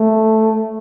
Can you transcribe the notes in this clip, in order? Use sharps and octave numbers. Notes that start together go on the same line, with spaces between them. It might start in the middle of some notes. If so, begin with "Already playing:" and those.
Already playing: A3